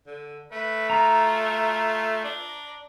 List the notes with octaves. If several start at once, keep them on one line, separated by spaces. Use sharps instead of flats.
D3
A3 B4
F4 A#5
D4